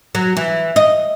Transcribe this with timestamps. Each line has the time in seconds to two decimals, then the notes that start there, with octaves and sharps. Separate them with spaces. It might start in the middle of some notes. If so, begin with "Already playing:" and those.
0.15 F#3
0.37 E3
0.76 D#5